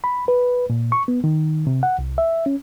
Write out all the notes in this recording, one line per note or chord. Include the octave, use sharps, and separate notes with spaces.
B5
B4
A#2
C#6
B3
D#3
C3
F#5
C2
E5
C#4